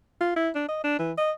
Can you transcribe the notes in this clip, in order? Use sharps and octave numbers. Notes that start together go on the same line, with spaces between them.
F4
E4
D4
D#5
D4
E3
D#5